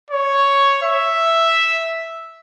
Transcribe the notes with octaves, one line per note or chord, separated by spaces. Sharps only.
C#5
E5